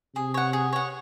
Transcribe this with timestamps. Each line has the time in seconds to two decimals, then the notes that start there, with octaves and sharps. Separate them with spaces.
0.15 C3 G#4
0.34 C#5 F#5
0.53 G#4
0.73 C#5 F#5